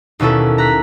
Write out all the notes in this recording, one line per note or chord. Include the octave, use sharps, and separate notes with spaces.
D#2 B2 C#4 E4 A4
A#5 F#6 B6